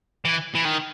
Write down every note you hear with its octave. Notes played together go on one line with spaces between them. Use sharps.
E3
E3
D#3